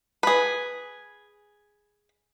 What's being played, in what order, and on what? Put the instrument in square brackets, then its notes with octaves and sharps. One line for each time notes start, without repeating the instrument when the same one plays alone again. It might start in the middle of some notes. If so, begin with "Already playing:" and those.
[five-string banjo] G#4 B4